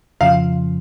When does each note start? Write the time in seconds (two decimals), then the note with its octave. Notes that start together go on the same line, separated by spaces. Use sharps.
0.21 F2 C#3 F3 F5